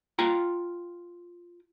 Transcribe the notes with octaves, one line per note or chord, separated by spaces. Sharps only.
F4 G5 A#5